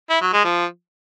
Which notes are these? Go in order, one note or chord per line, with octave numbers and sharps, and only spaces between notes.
E4
F#3
G#3
F3